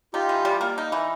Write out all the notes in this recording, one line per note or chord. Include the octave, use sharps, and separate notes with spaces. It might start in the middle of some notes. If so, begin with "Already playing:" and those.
D#4 F4 G4
E3
G3
A#3
D#4
E3